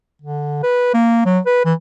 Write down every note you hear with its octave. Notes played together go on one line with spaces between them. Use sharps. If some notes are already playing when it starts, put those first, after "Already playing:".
D3
B4
A#3
F#3
B4
E3